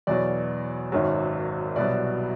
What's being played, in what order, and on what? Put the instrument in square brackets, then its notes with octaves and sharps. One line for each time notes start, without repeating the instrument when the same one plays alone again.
[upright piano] E2 B2 F#3 D5
G#1 F#2 D#3 F#3
C2 B2 F#3 D5